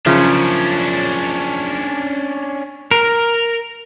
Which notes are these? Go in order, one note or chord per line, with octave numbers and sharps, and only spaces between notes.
F#2 C#3 F3 C#4 D4
A#4